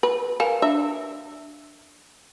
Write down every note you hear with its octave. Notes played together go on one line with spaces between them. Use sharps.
B4
A#4 F5 G#5
D4 E5